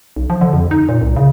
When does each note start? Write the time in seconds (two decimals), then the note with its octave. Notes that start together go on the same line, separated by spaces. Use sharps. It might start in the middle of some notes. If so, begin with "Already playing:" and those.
0.16 B1
0.30 F3
0.41 D3
0.53 F2
0.71 D#4
0.89 A#2
1.02 C2
1.17 C#3